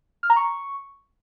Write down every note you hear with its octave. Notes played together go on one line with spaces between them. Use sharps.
F6
A#5
C#6